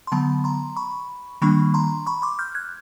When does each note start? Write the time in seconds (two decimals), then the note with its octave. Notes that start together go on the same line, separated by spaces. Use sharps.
0.07 C6
0.12 D3 F#3 B3 A5 B5
0.44 A#5 C6
0.76 B5 C#6
1.42 D#3 G3 A#3 D4 B5 C#6
1.74 A#5 C6
2.07 B5 C#6
2.22 C6 D6
2.39 F6 G6
2.55 F#6 G#6